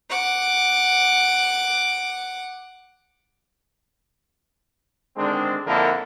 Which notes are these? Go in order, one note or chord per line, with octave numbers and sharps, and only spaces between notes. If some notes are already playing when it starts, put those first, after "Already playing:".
F#5 D6
D3 D#3 G#3 C4 D4
F2 D3 A#3 E4 A4 A#4